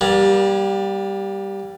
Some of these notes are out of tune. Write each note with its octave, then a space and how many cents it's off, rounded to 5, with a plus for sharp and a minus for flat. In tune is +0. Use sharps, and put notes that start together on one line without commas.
G3 +0 A#3 +40